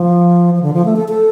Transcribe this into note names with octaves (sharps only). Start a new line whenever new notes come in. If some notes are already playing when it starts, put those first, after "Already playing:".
Already playing: F3
F3
D3
F3
A3
A4
A4